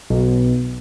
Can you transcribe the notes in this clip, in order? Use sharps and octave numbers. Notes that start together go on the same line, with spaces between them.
B1